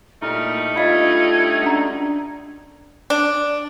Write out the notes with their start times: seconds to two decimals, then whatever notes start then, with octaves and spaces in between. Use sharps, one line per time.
0.22 A#2 G3 A3 D#4 E4 F6
0.76 D4 F4 D#5 F5 B5 G#6
1.63 C#4 D4 F#4 A#5
3.10 D4